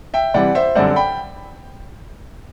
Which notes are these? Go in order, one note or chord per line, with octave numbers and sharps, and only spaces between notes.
E5 G5
C3 E3 G3 D5 F#5
C5 E5
F#2 D3 G3 C4 D5 F#5
G5 B5